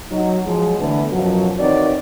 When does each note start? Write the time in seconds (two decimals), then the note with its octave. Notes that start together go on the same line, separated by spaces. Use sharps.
0.11 F#3 D#4
0.46 F3 F#3 G#3
0.80 D3 E3 A3 B3
1.11 F#2 B2 F3 F#3
1.60 D#3 E3 C4 F#4 C#5 D5